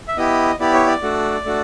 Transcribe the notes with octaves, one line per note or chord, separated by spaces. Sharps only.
E5
B3 E4 G4 D#5
B3 E4 G4 D5
C#5
D5
A3 D4 F#4
A3 D4 F#4